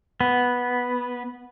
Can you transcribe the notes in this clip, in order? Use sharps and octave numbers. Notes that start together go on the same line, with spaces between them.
B3